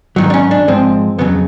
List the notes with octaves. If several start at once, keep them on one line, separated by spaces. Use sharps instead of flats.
G#2 D#3 F#3
D4
C#4
D4
G#2 F3 G#3 C4
F2 C#3 F#3 B3